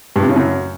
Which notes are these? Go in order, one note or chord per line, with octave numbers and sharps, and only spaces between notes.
G2
C3
C#3
F#2